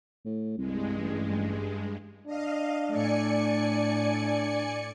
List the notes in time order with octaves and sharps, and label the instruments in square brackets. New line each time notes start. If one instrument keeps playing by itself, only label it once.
[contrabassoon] A2
[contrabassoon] C2 [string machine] G2 G#3
[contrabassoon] A1
[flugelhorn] D4 [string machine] D#5 F5
[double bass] A2 A3 [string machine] D5 G#5 C#7